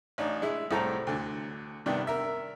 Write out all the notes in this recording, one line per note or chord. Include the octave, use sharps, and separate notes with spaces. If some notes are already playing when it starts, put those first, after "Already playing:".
A1 D4 D#4
G#3 E4
C2 A2 A4 C5 A#5
D2 D3
G2 C3 D#3 B3 D4
A#4 E5